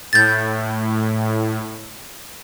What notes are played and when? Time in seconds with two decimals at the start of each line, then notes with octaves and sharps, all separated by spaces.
0.13 A2 G6 A6